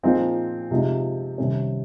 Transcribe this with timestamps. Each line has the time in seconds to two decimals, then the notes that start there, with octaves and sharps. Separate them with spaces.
0.03 A#2 F3 C4 D#4 G#4
0.71 C3 F3 G#3 D#4
1.38 C2 C3 D#3 G3 C#4